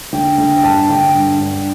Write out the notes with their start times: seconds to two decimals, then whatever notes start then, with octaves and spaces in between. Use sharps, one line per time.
0.13 D3 G5
0.38 D3 G5
0.57 G5
0.63 G2 A5
0.89 D3 G5
1.15 G2
1.40 G2